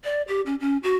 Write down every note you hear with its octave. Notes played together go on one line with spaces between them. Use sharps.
D5
G4
C#4
C#4
F#4